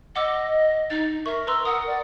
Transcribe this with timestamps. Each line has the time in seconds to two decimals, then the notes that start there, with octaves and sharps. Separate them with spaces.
0.16 D#5 F#5 D6 E6
0.90 D#4 A6
1.26 A#4 E5 C#6
1.47 B4 A#5 C6 E6
1.65 F#5 D#6
1.87 D5